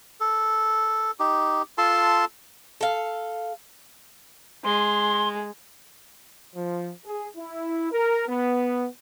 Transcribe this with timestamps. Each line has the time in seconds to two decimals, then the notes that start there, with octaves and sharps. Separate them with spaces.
0.20 A4
1.20 D#4 G4
1.78 F4 A4 A5 C6
2.81 A4 F5
4.64 G#3 C6
6.55 F3
7.06 G#4
7.37 E4
7.92 A#4
8.28 B3